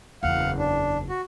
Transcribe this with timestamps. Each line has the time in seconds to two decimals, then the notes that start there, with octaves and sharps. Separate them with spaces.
0.23 F#1 E2 F5 F#5
0.58 D4
1.09 F#4